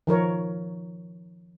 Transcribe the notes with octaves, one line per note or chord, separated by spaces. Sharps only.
D#3 F3 A#4 C#5